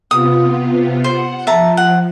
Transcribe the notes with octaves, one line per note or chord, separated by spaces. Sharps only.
C3 B3 F4 D#6
C5 F#5
F3 E5 A5 A#5
F#5